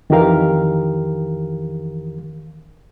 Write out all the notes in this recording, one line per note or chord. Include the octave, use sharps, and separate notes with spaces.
F2 D#3 E3 G4 A#4 F5